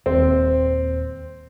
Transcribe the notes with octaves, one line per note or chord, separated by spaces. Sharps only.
D#1 C4